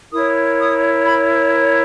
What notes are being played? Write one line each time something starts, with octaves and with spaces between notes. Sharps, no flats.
E4 A#4 C#5 D#6
D#6
B5